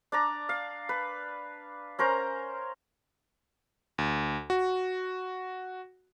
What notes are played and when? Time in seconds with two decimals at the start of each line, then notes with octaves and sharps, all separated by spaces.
0.12 D4 D5 A#5
0.49 F5
0.89 B4
1.99 C#4 A#4 C5 A#5
3.98 D2
4.50 F#4